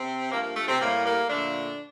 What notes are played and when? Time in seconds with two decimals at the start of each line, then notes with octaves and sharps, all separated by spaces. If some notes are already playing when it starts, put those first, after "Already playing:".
Already playing: C3 C4
0.31 G2 F3 A3 A#3
0.43 A#3
0.56 A3
0.68 C3 C4
0.80 A2 G3 A#3
1.06 A#3
1.29 A#2 D3 F3 A3 D4